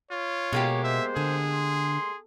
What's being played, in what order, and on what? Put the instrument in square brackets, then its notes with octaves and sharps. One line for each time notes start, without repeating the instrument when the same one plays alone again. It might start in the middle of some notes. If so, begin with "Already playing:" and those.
[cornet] F4 [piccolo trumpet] C#5
[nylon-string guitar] B2 [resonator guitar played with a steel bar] G#3 A#3 G4
[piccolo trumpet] C5 [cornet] E5
[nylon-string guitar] D3 [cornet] G#4
[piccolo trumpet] C6